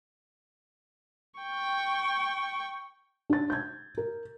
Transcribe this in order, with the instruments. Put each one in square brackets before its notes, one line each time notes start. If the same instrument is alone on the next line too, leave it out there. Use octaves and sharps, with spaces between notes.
[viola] G5 C#6
[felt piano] D4 A6
G6 G#6
A#4